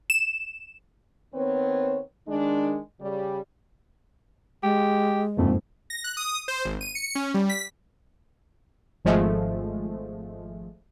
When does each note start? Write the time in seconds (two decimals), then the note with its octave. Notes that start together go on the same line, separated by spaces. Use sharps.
0.10 E7
1.34 D#3 B3 C4 B4 C#5
2.28 D#3 G#3 D4
3.01 C#3 G3
4.63 G#3 G4
5.37 F#1 F2 G#2 A3
5.90 A#6
6.04 F#6
6.17 D#6
6.48 C5
6.65 G#1
6.81 D#7
6.95 C#7
7.15 C#4
7.34 G3
7.49 B6
9.05 G#1 F3 G#3 A3